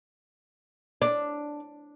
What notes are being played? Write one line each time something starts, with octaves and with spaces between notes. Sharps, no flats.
D4